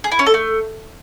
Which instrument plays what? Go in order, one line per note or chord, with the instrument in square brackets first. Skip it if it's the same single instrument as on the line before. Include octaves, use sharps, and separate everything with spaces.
[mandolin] G#4
E4
C#4
A4
A3